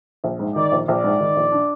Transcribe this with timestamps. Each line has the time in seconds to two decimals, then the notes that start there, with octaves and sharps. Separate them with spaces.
0.24 A#1
0.39 G#2
0.55 D#3 D5
0.72 A#1
0.87 A#1 D5
1.04 G#2
1.21 D#3
1.36 A#1
1.52 D4